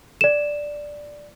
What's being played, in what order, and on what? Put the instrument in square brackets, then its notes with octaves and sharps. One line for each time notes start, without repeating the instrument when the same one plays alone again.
[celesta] D5 E7